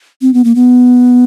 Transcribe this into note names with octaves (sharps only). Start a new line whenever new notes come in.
C4
B3
A#3
B3